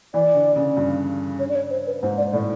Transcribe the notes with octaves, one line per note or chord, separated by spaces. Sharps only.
E3 D5
D3
C#3
G2
C#5
D5
C#5
C5
B4
G#2 C5
D5
A2 D5